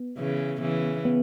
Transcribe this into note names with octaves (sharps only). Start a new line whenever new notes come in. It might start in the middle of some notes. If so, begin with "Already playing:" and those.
Already playing: B3
C#3 E3
C#3 E3
B3